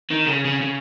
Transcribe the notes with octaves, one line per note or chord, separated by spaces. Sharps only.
D#3
C#3
C#3
C#3